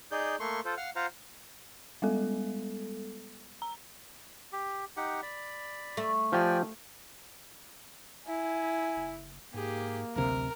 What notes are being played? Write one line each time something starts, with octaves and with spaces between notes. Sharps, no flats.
D#4 G#4 D5 G6
A3 A#3 C6 C#6
F4 A4 C5
F5 F#5 F6
F4 C5 F5 F#5 A#5
G3 G#3 B3 A4
A#5
G4
D#4 G4 F#5
D5 B5
A3
F3 G4 D5 G5 G#5
E4 G#5
F#1
G#2 A#3 G4 G#4
D1 A1 D2 C3 A#4